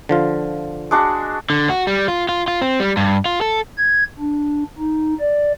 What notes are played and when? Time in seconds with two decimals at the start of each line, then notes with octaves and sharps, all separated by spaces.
0.09 D3 F3 F4
0.91 G#3 D4 F#4
1.50 D3
1.70 F#4
1.87 G3
2.08 F4
2.29 F4
2.48 F4
2.62 C4
2.80 G3
2.97 G2
3.25 F4
3.41 A4
3.77 G#6
4.19 D4
4.78 D#4
5.20 D5